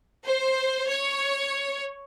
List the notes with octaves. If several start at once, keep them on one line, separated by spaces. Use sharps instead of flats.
C5
C#5